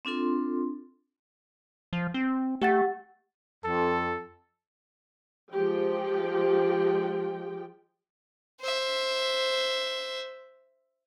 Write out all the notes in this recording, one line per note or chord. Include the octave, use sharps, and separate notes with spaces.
C4 D4 F4 A4 C6
F3
C4
A3 G4 F#5 A6
F2 A4
F3 G#3 G4 G5
C5 E5